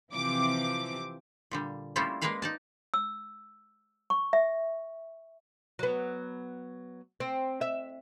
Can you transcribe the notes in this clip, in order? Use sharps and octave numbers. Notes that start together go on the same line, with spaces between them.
C3 E3 F3 C4 D6
A#2 D3 G3
G3 A3 A#3 C#4 E4 F4
G#3 A#3 G#4 A#4 B4 F5
D#4 D5 A5
E6
C#6
E5
F#3 B3
C4
E5